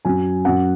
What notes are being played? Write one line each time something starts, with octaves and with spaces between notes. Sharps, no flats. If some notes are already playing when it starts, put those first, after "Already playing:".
F#2 F#3 G#5
F#2 F#3 F#5